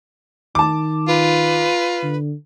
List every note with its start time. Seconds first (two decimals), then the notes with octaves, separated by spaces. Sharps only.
0.55 D#3 A5 D6
1.08 F4 B4
2.03 D3